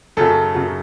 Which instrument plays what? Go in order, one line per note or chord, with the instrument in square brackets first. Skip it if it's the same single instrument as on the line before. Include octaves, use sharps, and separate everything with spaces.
[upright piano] F#2 C#3 F#3 A4
F#2 C#3 F#3